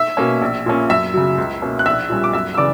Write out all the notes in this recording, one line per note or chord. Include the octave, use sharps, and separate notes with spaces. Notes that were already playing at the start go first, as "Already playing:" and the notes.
Already playing: E5 E6
B2 A#3 C#4
A#1
A#2 A#3 C#4
F#2 E5 E6
C#3 F#3
C#2
B2 A#3 C#4
F#6
A#1 E5 E6
A#2 G3 C#4
D6
F#2 E5 E6
E6
C#3 E3 D5 D6